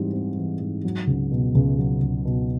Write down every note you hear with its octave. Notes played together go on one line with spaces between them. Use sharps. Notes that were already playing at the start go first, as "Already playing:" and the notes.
Already playing: G#2 E3 G3 C4
C4
E3
G#2
F#3
C#2
B2
C#2
F#3
C#2
B2